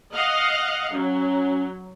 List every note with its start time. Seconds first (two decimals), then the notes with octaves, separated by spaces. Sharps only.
0.14 D#5 F5 F#5
0.94 F#3 C#4